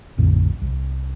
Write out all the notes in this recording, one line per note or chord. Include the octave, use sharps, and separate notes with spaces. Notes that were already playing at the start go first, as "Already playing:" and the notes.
A#1 F2 A2 D3
C2